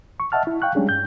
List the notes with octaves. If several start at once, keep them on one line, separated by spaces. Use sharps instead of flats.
C#6
D#5 E5 F#5 A5 F6
E4
F5 G5 C#6 F#6
G3 G#3 C#4 D4 G#4
G2 G6